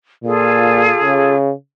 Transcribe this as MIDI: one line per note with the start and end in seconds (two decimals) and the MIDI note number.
0.24 0.91 46
0.24 1.34 65
0.24 1.34 68
0.24 1.34 69
1.02 1.52 49